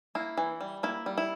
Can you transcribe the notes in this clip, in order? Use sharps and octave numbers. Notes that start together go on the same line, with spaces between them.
A#3 E4
E3
G3
A#3 E4
G3
E4